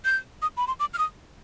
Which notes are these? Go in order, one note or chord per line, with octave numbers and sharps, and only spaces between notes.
G6
D#6
B5
C6
D6
F6
D#6